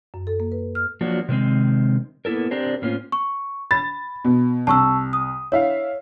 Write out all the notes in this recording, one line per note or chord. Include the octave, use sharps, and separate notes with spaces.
F#2
A4
A#3
B4
F6
F3 F#3 A#3 D4 F#4
C3 D#3 G#3 C4
A#3 B3 E4 A4 A#4
C4 D4 G4 A#4 C5
A2 A#3 C4 C#4 F4
C#6
B5 A6
B2
C2 A5 C#6 E6
D#6
E4 C#5 E5 F5